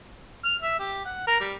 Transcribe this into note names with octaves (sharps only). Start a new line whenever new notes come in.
F6
E5
G4
F#5
A#4
G3